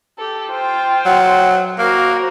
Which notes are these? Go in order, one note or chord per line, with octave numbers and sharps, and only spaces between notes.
G4 A4
F4 C5 G5
F#3
A#3 F#4 A#4 C5